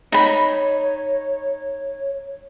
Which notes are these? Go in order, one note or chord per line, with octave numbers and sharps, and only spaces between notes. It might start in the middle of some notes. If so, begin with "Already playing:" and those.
D#4 C#5 B5